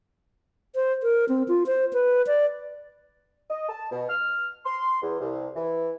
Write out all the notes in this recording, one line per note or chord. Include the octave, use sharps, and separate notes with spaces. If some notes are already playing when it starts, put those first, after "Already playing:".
C5
A#4
C4
F4
C5
B4
D5
D#5
A5
B2
F6
C6
E2
C2
E3